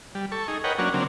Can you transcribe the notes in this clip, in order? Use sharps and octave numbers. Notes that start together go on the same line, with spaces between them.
G3
A4 C#6
D#4 G#4
A#4 B4 C#5 D#5 F#5 G5
F#3 A#3 C#4 D4 F#4
C#3 F#3 A#3 C4 D4